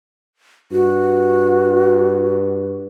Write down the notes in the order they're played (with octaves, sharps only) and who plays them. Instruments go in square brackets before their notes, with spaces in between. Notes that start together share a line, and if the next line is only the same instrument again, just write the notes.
[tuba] G2 [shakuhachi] F#4